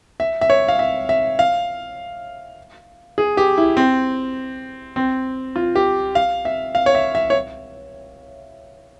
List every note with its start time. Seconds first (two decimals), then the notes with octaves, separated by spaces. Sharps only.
0.20 E5
0.41 E5
0.50 C#5
0.68 F5
0.79 E5
1.09 E5
1.39 F5
3.18 G#4
3.37 G4
3.57 E4
3.77 C4
4.96 C4
5.56 F4
5.75 G4
6.15 F5
6.45 E5
6.75 F5
6.86 C#5
6.95 E5
7.15 E5
7.30 C#5